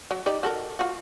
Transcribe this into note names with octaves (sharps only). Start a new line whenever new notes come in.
F#3
D#4 G4 D5
F#4 A4 A#4
F4 F#4